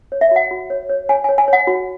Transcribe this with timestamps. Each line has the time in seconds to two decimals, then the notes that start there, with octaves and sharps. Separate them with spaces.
0.12 C#5
0.21 E5
0.31 F#4 F#5
0.51 F#4
0.70 C#5
0.89 C#5
1.09 C#5 G#5
1.24 C#5 G#5
1.38 G#5
1.48 C#5 F#5
1.67 F#4